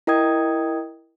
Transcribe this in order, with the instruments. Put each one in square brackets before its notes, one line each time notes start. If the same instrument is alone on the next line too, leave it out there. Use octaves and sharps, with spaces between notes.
[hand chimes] E4 A#4 D#5 G5 D#6 G#6